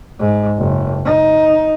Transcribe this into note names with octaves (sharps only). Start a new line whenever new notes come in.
G#2
F#1
D#4